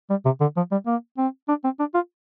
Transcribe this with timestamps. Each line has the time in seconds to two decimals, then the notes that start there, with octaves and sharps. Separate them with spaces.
0.10 G3
0.25 C3
0.40 D3
0.56 F3
0.71 G3
0.86 A#3
1.18 C4
1.48 D4
1.64 C4
1.79 D4
1.94 F4